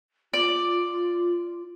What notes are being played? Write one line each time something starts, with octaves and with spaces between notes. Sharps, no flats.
F4 D5